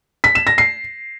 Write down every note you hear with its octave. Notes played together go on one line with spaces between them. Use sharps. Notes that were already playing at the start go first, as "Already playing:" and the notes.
B6
E7
A#6
C7